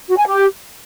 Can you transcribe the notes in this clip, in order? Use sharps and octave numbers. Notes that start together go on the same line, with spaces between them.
F#4
G#5
G4